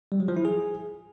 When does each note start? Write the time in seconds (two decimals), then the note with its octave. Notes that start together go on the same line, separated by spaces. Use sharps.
0.12 G3
0.20 F#3
0.28 F3
0.37 E4
0.45 G#4